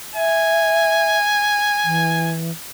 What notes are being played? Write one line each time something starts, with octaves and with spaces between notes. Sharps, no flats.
E5 G#5
E3